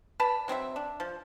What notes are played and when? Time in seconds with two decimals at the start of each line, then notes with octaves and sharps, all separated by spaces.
0.20 B4 D5 A5 B5
0.48 F#3 C4 G#4 E5
0.76 D4
1.00 F3